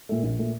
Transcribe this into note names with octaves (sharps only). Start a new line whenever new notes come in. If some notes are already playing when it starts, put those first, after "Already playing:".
A#2 A3
A#1
A#2 A3